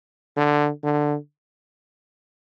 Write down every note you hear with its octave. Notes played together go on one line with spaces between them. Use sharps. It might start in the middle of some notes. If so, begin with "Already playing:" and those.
D3
D3